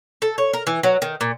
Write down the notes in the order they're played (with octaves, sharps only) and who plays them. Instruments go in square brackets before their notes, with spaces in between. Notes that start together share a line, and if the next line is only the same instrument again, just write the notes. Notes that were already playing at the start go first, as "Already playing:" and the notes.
[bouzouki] A4
C#5
A#4
E3
F#3
D#3
A#2